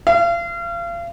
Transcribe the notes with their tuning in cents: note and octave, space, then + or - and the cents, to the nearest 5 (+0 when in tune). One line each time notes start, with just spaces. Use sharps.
F5 -35